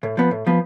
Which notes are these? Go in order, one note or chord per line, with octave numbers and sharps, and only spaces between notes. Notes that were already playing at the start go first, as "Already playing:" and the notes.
A2
F3 B3
A2
F3 B3